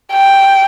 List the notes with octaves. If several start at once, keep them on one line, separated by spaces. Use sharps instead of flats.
G5